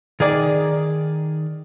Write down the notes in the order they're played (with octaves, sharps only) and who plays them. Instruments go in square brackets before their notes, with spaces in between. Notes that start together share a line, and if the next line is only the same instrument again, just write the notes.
[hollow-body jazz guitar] D#3 G#4 D5